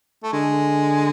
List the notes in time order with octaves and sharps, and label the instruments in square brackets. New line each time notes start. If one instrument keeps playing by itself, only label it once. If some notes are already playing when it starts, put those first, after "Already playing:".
[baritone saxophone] A3
[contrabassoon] D3 [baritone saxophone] G#3